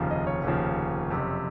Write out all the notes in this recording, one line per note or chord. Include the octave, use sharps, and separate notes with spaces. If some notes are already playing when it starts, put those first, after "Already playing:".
Already playing: F1 D#2 C#3 F3
D#5
C#5
F1 D#2 C#3 F3
F#1 F2 C3